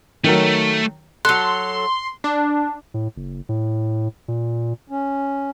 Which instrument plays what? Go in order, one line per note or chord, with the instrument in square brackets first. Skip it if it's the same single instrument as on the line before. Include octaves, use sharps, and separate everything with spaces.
[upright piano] D#3 F#3 [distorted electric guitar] A3
[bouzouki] F#3 A4 [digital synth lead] C6 [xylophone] F#6
[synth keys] D4
[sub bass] A2
F#1
A2
A#2
[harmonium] C#4